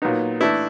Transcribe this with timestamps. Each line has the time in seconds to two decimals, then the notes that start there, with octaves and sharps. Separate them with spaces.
0.02 A#2 F#3 B3 D#4
0.40 E3 A3 D4 E4